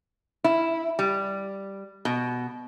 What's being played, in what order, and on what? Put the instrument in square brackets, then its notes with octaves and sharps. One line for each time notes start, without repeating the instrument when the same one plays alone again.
[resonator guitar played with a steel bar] E4
G3
B2